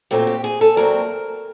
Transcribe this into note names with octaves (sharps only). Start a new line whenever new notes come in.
A#2 F#3 A3 C4 G4
G4
G#4
A4
A#2 F#3 A3 C4 A#4